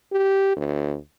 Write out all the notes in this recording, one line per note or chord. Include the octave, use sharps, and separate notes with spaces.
G4
D2